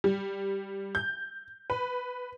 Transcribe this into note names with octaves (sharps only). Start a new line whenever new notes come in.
G3
G6
B4